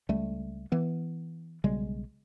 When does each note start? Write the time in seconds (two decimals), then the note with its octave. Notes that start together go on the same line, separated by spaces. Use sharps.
0.09 C#2 G3 A3
0.72 E3 B3
1.64 B1 C#3 G3 G#3